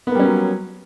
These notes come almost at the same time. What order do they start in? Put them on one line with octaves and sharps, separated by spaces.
B3 A#3 G3 C#4 F#3